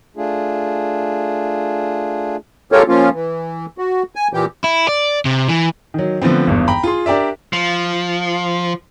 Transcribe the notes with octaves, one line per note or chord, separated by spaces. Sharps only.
A3 D4 F4 G#4
G#3 F4 G4 A4 A#4 C#5
F3 A#3 C#4 F4
E3
F#4
G#5
A#2 E3 G4
E4
D5
C3
E3
D#3 F#3
D3 F3 A3 B3 C4
G#1 E2 G2
G5 A#5 B5
F4 G#4 C6
D4 G4 A#4 D5 E5
F3